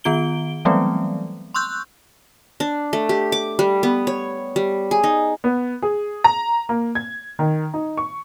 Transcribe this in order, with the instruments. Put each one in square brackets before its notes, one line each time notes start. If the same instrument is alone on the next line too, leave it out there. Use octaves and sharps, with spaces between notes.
[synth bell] D#3 B3 F4 D7 G7
E3 F#3 G3 A3 B3 C4
C6 C#6 E6 F#6 G6
[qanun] D4
A3
G4
D6
G3
B3
C#5
G3
G#4
D#4
[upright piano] B3
G#4
A#5
A#3
G#6
D#3
D#4
C#6